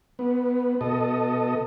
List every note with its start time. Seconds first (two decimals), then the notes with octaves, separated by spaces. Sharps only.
0.19 B3
0.81 B2 A4 D#5